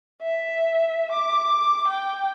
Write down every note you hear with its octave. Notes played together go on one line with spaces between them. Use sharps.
E5
D6
G5